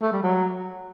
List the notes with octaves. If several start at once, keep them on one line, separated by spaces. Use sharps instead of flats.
A3
G3
F#3